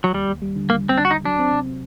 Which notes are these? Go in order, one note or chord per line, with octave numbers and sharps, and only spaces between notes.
F#3
D#2 G3
D#2
G3
D3
D#2 A#3
D3
C4
D3 D4
F#4
D#2 D#4
F#3 D4
C4
C3
C3